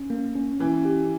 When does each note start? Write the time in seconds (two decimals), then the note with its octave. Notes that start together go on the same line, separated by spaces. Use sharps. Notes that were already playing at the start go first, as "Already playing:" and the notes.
Already playing: C#4
0.10 A#3
0.35 C#4
0.60 E3 C#4
0.85 G4